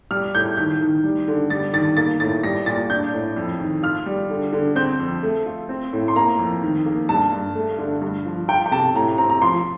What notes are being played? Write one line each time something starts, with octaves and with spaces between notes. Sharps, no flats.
G3 F6
A2 G6
D#3 G6
D#3
G3
D3
G3 A6
D#3 A6
A#3 A6
A2 A6
G3 A#6
A#2 A6
D4 G6
A2
F2
D#3
F4 F6
G3
D3
D3
C4 G6
F2
A3
F4
C4
A2
C6
A#3 A#5
F2
D#3
A#3
G2 A5
G2
A3
D3
G2
F3
F4 G5
G5
C3 A5
A2 A#5
C4 A#5
A#5
F3 C6